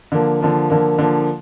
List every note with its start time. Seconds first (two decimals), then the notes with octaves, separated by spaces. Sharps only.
0.12 D3 F3 A#3
0.41 D3 F3 A#3
0.70 D3 F3 A#3
0.99 D3 F3 A#3